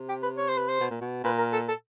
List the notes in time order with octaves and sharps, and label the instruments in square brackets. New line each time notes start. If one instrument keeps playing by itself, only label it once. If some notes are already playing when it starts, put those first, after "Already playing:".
Already playing: [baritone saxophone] C3
[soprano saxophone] G4
B4
C#5
C5
B4
C5
[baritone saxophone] B2
A#2
B2
[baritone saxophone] A#2 [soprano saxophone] B4
[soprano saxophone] A#4
A4
A4